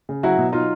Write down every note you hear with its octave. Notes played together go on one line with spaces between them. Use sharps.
C#3
F#3 E4 F#4
B2
F#3 D#4 F4